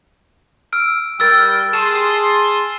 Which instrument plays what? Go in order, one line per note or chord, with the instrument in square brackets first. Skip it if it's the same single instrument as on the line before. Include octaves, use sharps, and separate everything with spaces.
[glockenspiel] E6 F6 D7
[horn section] G3 A#4 G5 [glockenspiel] E6 A6
[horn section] G#4 A5 C6 [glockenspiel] E7